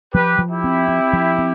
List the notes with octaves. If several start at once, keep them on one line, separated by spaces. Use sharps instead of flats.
F3 G4 B4
F3
E4 G4
C4
C4
F3
C4